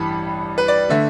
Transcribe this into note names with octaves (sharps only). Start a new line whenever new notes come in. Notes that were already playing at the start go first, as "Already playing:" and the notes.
Already playing: A1 G2 E3 G3 A5 B5
B4
D5
D3 A3 E5